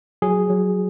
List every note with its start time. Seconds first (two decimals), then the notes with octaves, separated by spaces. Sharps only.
0.22 F#3 G#4
0.50 F#3